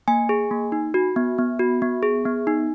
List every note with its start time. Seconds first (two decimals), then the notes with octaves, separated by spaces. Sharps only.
0.08 A#3 G#5
0.29 G#4
0.51 A#3
0.72 D#4
0.94 F#4
1.16 B3
1.38 B3
1.59 F#4
1.82 B3
2.03 G#4
2.25 B3
2.47 D#4